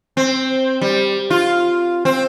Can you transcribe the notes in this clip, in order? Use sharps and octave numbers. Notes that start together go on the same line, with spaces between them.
C4
G3
F4
C4